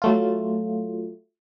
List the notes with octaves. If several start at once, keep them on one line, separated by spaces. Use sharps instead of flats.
F#3 A3 F4